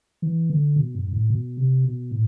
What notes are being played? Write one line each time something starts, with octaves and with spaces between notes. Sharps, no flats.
E3
D3
B2
G2
G2
A2
B2
C3
B2
A2